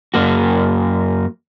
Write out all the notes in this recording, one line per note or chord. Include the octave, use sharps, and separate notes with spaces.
F#2 A#3 F#4